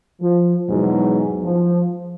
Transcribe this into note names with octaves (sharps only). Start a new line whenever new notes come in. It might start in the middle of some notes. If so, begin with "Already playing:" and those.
F3
E2 G#2 B2 F#3
F3